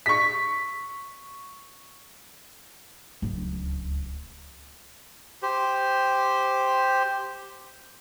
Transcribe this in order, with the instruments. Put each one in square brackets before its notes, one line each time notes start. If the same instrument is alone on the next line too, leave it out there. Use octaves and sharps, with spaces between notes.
[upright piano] C#6 B6
[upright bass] D1 C#2
[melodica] G4 C5